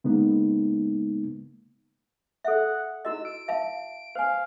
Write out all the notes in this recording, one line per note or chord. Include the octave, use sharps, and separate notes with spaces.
C#3 G#3 A#3 B3 D#4
A4 E5 F#5
E4 F#4 D#5 E6
D7
E5 F5 A5
C5 F5 G#5